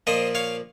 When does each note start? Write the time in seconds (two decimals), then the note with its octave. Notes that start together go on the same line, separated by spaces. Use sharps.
0.07 A#2 F3 A#3 C5 D#5
0.35 C#5 F5